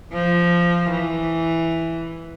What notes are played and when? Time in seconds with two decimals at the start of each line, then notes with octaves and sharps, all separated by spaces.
0.13 F3
0.91 E3